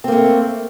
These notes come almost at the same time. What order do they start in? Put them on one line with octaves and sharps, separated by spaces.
C4 A#3 A3